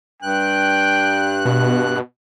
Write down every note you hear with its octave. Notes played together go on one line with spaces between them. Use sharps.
G2 G5 F#6
B2